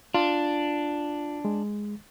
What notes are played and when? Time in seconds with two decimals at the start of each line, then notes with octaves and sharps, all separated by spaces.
0.14 D4 F4
1.45 G#3